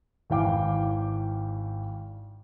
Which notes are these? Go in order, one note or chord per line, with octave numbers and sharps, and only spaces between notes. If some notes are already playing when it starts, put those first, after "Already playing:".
G#1 E3 F5 G5 D6